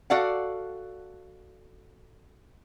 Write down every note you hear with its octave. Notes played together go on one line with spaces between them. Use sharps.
F#4 A4 D5 F5 F#5